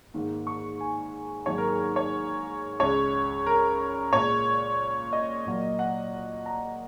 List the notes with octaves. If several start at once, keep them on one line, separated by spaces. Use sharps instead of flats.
G#2 D#3 A#3
C#6
G#5
G#2 D#3 F#3 A#3 C#5
A#4
G#4
A#4
C#5
C#2 C#3 G#3 C#5
A#4
A#2 G#3 C#5
D#5
A#2 F#3 A#3
F#5
A#5